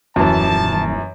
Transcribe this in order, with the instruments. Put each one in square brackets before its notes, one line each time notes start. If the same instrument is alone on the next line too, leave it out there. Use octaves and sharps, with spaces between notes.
[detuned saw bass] D#1 [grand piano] F#2 E3 [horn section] A5